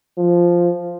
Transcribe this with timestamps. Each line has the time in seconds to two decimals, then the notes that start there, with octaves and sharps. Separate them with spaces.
0.17 F3